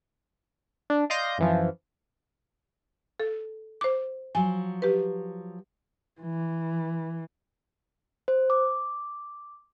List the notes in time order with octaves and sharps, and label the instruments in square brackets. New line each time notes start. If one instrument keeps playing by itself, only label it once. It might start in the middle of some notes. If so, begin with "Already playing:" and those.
[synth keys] D4
D5 D#5 F5 C6 G6 A#6
F#2 E3 F3
[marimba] A4
C5 D6
[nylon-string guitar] F3 F#3 [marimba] G#5
[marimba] G4 B4
[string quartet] E3
[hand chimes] C5
D6